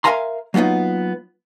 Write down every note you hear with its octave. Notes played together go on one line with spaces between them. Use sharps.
A#4 E5 F5 G#5 A#5 C6
F#3 A#3 B3 D#4 F4